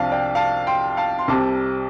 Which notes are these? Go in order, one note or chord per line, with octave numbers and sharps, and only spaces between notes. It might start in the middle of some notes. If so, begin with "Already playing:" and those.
Already playing: C2 C3 F3 D4 F5 A5
D5 G5
F5 A5
G5 C6
F5 A5
C6
C2 C3 G3 A5 D6